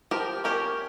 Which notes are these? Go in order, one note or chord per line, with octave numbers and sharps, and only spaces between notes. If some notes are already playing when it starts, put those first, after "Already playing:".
F3 G4 A#4
A#3 C#4 G4 A#4